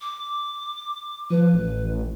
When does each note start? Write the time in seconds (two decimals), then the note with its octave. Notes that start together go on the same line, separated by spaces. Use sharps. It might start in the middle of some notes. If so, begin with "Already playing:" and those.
0.01 D6
1.30 F3 B4
1.54 A1